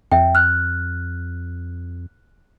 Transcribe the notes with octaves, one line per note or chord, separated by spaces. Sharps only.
F2 E5 G5
F6 F#6